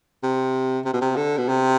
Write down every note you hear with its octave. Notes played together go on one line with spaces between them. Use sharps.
C3
C3
B2
C3
D3
B2
C3